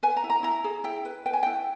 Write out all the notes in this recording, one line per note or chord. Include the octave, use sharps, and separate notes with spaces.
B4 G#5
A#5
E4
A#5
E4 A#5
G#4
E4 G5
B4
B4 G5
G#5
E4 G5